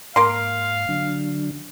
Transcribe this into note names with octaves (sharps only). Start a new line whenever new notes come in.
G#2 A#3 F5 C6
D3 F#3 D4